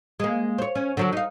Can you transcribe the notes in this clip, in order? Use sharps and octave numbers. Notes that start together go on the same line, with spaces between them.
G#3 A#3
C5 C#5
C#4
D3 F#3 A#4
D#4 F5